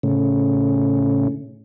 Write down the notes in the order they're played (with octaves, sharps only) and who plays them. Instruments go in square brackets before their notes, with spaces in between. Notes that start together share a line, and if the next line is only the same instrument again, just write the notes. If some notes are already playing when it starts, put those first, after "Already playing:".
[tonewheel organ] A2 C#3